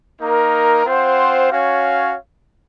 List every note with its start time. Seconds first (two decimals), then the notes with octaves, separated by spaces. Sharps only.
0.20 A#3 D#4 A#4
0.85 C4 F4 C5 F#5
1.51 C#4 F#4 C#5 F5